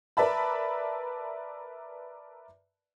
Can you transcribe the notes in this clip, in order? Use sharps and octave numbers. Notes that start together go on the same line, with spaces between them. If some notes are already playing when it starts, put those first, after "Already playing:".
A#4 B4 D5 E5 A5 B5